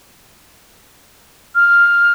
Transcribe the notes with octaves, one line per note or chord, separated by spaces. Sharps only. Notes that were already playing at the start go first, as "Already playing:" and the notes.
F6